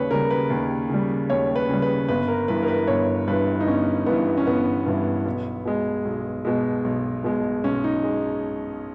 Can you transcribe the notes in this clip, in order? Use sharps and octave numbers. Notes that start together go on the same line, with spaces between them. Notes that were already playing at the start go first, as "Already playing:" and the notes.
Already playing: D#2 C#3 G3 B4 C#5
C#3 G3 A#4
B4
D#2
C#3 G3
D#2 C#5
B4
C#3 G3
B4
G1 B4
A#4
G2 E3 B4
A#4
B4
G1 C#5
G2 E3 B4
D#4
G1 C#4
G2 E3 B3
C#4
G1 B3
G2 E3
B1
B2 G#3
B1
B2 G#3
B1
B2 G#3
B1 C#4
D#4
G#3